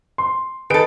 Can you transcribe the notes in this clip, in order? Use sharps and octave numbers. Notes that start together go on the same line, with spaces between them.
C6
D#3 G#4 A4 B4 D7